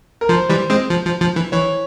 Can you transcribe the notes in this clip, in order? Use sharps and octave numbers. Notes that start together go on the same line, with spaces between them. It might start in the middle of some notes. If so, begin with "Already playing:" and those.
A#4
F3 C5
E3 G3
G#3 C4
F3
F3
F3
E3
E3 C#5